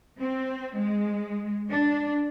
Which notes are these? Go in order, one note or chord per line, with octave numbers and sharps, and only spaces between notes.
C4
G#3
D4